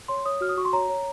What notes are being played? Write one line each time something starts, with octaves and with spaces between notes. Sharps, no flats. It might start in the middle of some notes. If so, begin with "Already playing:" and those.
C#5 C6
C#5 D#6
F#4 F6
D#6
F#4 C#6
C6
C#5 A#5
C#5